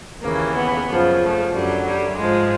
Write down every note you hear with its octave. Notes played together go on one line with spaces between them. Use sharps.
D#2 C#3 E3 A#3
B3
F#2 C#3 F3
A3
F#2 D3 F#3 G3
G3
G#2 F3 G#3